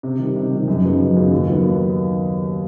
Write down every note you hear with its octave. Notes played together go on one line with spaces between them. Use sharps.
C3
D#3 G3
C3
D#3 G3
F#2
C#3 F#3 B3 D#4
F#2
C#3 F#3 B3 D#4
D#2
D#3 F#3 B3
D#2